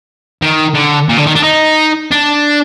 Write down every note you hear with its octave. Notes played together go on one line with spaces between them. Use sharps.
D#3
D3
A#2
D3
D#3
D4
D#4
D4